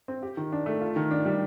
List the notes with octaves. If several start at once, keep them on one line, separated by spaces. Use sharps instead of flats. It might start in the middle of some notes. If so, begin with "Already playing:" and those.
C4
G4
D#3
D4
A3
F4
D#3
D4
G3